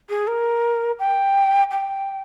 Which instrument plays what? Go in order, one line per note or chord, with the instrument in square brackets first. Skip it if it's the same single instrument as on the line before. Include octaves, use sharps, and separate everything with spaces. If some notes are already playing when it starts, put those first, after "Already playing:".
[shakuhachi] G#4
A#4
G5
G5